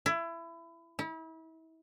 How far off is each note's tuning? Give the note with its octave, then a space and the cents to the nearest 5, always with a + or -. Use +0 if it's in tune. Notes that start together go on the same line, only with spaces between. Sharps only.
E4 +25
E4 -35